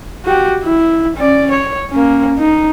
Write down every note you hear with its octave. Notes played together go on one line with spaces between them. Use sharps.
F#4 G4
E4
C#4 D5
C#5
A#3 C#4
D#4